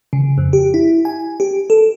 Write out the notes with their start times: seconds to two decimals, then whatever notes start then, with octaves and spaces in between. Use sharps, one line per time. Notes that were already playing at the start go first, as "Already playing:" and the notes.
0.13 C#3
0.38 F2
0.53 G4
0.74 E4
1.05 G#5
1.40 G4
1.70 A4